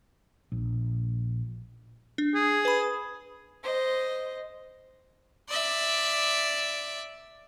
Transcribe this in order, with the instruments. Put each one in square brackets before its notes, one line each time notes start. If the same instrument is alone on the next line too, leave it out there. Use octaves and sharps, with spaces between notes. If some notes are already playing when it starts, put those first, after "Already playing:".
[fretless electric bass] A#1
[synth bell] D4
[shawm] G#4
[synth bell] B4 B5
[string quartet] C5 D#5
[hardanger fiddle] D5 E5